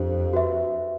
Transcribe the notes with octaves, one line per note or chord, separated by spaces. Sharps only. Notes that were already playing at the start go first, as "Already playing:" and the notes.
Already playing: F2 D4 G4 C5
F#4 B4 E5